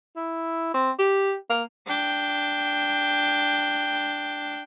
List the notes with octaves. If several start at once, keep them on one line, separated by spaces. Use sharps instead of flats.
E4
C4
G4
A#3
D4 G5